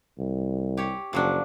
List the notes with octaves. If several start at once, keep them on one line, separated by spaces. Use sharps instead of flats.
C2
G4 C#5
F#1 F3 F#3 D4